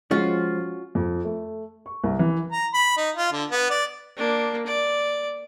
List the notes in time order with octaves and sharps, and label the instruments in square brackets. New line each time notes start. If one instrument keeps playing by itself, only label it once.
[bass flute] F3 [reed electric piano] G#3 [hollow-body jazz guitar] C#4 F#4 [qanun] F4
[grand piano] F2
A3
C#6
C2
E3
[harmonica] A#5
B5
D#4
F4
D3
B3
D5
[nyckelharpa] A#3 D4
D5